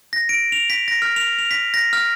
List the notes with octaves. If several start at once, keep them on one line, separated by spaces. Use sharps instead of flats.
A#6
D7
F7
B6
A#6
F6
F7
F7
B6
A#6
F6